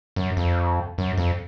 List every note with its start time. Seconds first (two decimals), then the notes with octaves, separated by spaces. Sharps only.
0.16 F#2
0.37 F2
0.98 F#2
1.17 F2